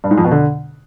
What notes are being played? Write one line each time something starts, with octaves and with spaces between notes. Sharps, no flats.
G2
G#2
F2
B2
D3